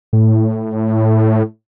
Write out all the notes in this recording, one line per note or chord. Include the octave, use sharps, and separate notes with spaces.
A2